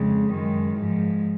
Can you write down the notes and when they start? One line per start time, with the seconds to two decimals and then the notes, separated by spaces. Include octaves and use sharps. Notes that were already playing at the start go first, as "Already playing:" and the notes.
Already playing: F2 C#3 G#3
0.32 F#2 D#3 G#3
0.78 G#2 F3 G#3